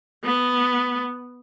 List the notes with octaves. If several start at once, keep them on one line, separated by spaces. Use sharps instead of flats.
B3